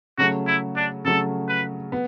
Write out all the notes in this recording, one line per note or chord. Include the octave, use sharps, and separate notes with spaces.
C#3 F#3 A3 F#4
E4
D4
C#3 F#3 A3 A4
B4
B3